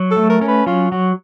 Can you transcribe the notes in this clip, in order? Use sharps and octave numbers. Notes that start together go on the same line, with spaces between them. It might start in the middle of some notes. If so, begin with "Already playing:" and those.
Already playing: F#3
A4
A3
A#4
C#4 A#4
B4
F#3 F4
F#3 F#4